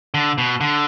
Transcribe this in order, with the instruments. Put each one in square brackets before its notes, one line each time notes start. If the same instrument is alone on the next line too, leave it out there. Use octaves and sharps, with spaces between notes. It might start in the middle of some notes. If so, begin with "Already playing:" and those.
[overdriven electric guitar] D3
B2
D3